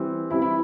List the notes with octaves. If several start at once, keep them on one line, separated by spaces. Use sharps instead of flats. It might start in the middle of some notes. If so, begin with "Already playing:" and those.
Already playing: E3 G3 C4
E3 G3 C4 E4
E4